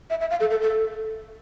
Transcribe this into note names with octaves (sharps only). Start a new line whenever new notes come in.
E5
E5
F5
A4
A4
A4